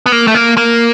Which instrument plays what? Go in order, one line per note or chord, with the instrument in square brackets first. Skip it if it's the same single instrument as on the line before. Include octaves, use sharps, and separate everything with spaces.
[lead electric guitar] B3
A#3
A3
A#3
A#3